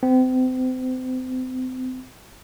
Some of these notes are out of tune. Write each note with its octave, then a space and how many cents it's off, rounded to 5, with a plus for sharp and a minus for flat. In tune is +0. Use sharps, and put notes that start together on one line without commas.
C4 -35